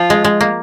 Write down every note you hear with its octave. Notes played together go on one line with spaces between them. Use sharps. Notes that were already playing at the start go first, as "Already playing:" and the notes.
Already playing: F3 F4
G#3
G#3
A#3